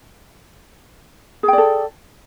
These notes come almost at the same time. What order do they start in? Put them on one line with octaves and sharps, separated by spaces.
G#4 G5 D5 A4